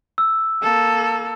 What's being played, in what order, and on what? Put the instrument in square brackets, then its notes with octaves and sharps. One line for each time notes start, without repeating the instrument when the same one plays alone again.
[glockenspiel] E6
[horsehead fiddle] A#3 A4